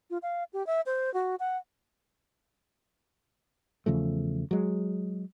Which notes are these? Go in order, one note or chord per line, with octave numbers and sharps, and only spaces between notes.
F4
F5
G4
E5
C5
F#4
F#5
E2 C#3 F3 A3
F#3 G#3